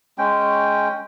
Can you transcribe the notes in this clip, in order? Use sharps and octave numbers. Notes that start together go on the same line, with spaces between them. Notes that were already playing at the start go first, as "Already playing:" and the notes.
G#3 C#4 G5